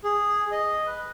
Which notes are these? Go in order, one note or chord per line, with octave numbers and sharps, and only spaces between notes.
G#4
D#5
B4